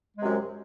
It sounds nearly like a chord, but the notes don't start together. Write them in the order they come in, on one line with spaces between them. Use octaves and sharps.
G#3 C3 F#2